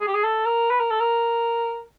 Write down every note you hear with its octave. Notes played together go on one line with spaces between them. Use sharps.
G#4
G4
G#4
A4
A#4
B4
A#4
A4
A#4